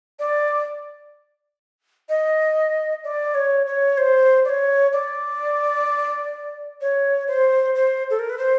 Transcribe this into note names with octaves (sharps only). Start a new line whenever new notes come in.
D5
D#5
D5
C#5
C#5
C5
D5
C#5
D5
C#5
C5
C5
A4
A#4
B4
C5